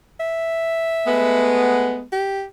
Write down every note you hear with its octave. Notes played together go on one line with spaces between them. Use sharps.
E5
G#3 A3 B3
G4